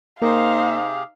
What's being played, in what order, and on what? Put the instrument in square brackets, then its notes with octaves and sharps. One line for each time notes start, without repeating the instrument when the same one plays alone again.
[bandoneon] C3 G4 G#4 [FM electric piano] A#3 A#4 [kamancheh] D#4 C5 [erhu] F5